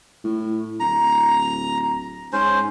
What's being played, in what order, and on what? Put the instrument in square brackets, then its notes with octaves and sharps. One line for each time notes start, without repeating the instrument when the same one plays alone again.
[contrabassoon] A2
[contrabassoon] D1 [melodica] A#5
[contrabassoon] G#2 [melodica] C#4 C5